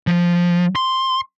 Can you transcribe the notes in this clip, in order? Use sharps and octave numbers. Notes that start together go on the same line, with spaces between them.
F3
C6